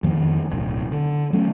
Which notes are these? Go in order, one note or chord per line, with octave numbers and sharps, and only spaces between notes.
F2 D#3 F3 A#3
D1 B1
D3
F#3 A3 C#4